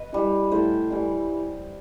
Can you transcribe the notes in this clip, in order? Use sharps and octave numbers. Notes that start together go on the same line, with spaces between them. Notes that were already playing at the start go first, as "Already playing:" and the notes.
Already playing: B4 D#5
E3 G3
A2 C5 E5
E3 G3